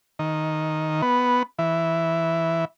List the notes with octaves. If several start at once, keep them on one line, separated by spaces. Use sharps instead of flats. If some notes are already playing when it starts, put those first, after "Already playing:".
D#3
B3
E3